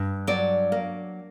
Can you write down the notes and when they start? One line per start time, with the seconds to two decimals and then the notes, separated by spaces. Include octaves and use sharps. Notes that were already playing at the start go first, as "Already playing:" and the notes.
Already playing: G2
0.27 F#3 D5
0.72 A#3